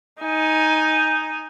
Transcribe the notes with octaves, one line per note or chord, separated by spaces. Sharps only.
D#4 G#5